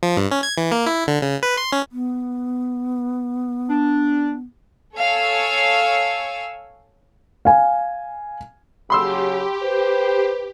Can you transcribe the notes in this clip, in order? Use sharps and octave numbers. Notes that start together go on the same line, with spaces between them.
F3
G2
C#4
G#6
E3
A#3
E4
D3
C#3
B4
C6
C#4
B3
D4
A4 C#5 F5 G#5 E6
F5 G#5
C#3 F#3 G4 B5 C6 E6
B4 C5